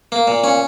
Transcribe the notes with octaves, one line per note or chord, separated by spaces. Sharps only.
A#3
A#2
C#4